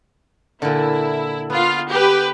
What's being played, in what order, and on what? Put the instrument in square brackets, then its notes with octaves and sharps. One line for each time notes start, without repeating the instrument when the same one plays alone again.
[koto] A#2 D3 [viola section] E4
[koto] B3 [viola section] F4
[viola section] G4 B4